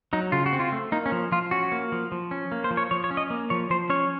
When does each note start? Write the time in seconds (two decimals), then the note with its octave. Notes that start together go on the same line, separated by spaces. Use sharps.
0.13 F#3 D#4
0.32 C#3 F4
0.46 F#4
0.53 C4
0.60 F4
0.72 A3
0.92 A#3 D#4
1.06 C#4
1.12 F3
1.32 F3 F4
1.51 C#4 F#4
1.72 A#3
1.92 F3
2.12 F3
2.31 C#4
2.52 A#3
2.64 C5
2.71 F3
2.77 C#5
2.91 F3 C#5
3.04 C#5
3.11 C#4
3.17 D#5
3.30 A#3
3.50 F3 C#5
3.70 F3 C5
3.90 C#4 C#5